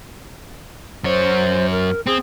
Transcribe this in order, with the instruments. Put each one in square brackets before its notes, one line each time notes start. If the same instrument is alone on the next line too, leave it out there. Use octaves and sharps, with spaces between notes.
[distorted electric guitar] F#2 C#5 [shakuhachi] C5
[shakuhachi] A#4
[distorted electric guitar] C4 [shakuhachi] G#4